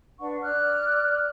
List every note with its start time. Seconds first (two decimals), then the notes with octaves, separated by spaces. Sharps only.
0.19 D4 B4 F#5 C#6
0.42 D5 F6 F#6